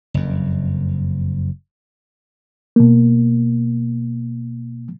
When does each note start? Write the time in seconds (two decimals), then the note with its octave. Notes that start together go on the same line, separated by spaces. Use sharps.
0.14 F#1 F2
2.76 B2 A#3